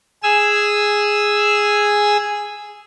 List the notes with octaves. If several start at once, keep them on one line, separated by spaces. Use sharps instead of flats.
G#4 G#5 E6